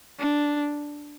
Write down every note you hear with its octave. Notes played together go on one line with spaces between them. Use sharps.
D4